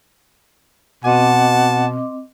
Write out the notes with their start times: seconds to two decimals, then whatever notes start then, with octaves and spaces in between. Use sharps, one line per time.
1.04 B2 C4 D#5 F#5 A5 D6